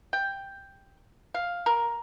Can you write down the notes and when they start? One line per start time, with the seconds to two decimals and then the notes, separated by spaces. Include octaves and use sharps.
0.13 G5
1.34 F5
1.66 A#4